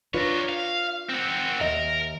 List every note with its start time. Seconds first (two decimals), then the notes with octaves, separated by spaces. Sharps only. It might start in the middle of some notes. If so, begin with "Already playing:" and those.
0.14 D4 F4 A#4 B4 C#5
0.49 F5
1.09 C4 F#4
1.60 D#2 A#4 D#5 E5